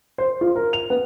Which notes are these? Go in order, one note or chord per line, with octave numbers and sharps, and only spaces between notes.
C5
F4
A#4
F7
B3